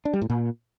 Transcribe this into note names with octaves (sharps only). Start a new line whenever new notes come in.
D4
G3
A2
A#2